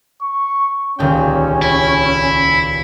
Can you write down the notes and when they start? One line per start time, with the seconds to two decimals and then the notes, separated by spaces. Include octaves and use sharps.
0.22 C#6
0.99 D#1 C#2 C#4 G5
1.62 E4